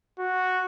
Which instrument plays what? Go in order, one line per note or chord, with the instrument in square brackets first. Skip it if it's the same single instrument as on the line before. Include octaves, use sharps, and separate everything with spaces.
[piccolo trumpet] F#4